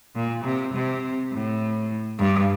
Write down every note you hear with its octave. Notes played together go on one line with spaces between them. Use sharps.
A#2
C3
C3
A2
G2